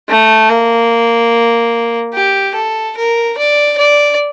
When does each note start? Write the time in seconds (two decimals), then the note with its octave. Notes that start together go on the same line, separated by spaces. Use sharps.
0.09 A3
0.49 A#3
2.14 G4
2.55 A4
2.97 A#4
3.38 D5
3.78 D5